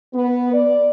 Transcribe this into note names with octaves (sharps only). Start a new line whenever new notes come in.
B3
D5